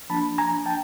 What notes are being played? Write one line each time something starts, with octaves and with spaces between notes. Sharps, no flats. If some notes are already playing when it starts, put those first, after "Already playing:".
F3 A#3 D4 A5 B5
G#5 A#5
G5 A5